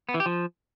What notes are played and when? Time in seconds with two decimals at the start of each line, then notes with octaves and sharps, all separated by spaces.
0.09 B3
0.14 E3
0.20 G4
0.26 F3